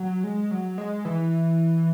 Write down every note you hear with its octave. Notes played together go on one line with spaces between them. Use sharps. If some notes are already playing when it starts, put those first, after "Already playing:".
Already playing: F#3
G#3
F#3
G#3
E3